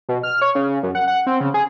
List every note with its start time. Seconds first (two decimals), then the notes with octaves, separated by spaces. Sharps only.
0.09 B2
0.23 F6
0.42 C#5
0.55 C#3
0.83 F#2
0.95 F#5
1.08 F#5
1.27 C4
1.41 C#3
1.54 G#4